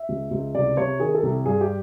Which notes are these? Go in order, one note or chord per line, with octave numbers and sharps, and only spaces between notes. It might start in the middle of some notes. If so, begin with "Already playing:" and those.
Already playing: E5
C#2
C#2
C2 D5
C3 C#5
D#3 G#4
A4
C2
G2 G#4
G4